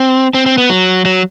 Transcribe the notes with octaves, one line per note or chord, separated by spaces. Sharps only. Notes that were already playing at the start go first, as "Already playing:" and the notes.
Already playing: C4
C4
C4
B3
F#3
F#3